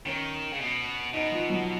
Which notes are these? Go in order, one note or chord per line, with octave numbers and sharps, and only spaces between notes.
D#3 C#4
C#3
B2
B2 D#4
F3
F#3